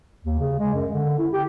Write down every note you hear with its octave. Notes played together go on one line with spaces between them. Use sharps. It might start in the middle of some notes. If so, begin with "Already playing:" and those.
D#2
C#3
G#3
F#2
D3
E4
G4